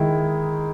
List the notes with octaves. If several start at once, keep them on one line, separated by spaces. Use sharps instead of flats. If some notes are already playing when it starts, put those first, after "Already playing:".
Already playing: D#3 G#3 E4